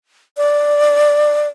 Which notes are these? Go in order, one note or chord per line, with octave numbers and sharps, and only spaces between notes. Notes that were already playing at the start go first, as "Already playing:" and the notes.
D5